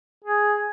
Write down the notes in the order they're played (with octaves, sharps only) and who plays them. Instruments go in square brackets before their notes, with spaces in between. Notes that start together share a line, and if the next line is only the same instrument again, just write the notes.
[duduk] G#4